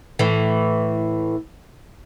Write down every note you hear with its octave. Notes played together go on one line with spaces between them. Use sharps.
A2 E3